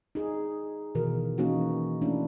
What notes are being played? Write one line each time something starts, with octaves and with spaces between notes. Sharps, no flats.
D#4 G#4
B2 D#3 E3 G#4 A#4
E3 A#3 C#4 D#4 F#4
A3 C#4 D4 E4